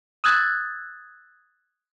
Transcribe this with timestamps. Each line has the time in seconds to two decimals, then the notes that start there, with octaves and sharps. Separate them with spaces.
0.24 D#6 E6 F#6 G#6 A6